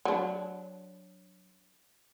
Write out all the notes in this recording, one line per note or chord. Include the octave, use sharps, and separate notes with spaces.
F#3 D4